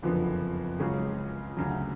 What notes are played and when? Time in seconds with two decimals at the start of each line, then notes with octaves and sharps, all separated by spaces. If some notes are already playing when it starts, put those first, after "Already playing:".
0.03 F#1 F2 D3 F3 B3
0.79 C#2 C#3 F#3 C#4 G#4
1.57 D2 C#3 F#3